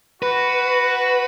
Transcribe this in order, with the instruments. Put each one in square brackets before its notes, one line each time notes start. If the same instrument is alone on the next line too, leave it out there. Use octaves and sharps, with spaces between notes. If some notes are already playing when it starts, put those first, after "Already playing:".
[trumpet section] F#4 [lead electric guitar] B4